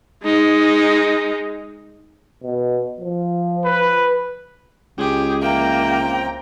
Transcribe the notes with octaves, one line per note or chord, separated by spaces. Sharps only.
G#3 D#4
B2
F3
B4
C#2 G4 G#4
A#3 E5 G5 A#5
C4